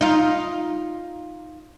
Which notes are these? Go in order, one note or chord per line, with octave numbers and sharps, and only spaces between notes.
D#4 F4